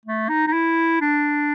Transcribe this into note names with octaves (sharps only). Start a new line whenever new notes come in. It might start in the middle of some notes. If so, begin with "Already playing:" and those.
A3
D#4
D#4
E4
D4